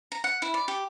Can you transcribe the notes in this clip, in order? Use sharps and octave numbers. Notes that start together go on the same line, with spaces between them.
A#5
F#5
E4
D5
G4